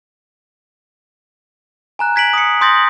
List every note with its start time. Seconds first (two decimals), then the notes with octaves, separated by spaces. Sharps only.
1.99 G#5 A#5 F#6
2.16 G#6 B6 D7 F#7
2.33 D#6 C#7
2.61 C6 D#6 G6 A6 A#6